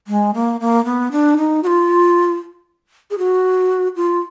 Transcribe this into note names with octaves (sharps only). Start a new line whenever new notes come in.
G#3
A#3
A#3
B3
D4
D#4
F#4
F4
G#4
F#4
F4